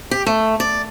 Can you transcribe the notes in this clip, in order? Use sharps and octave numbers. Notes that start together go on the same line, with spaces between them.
G4
A3
D5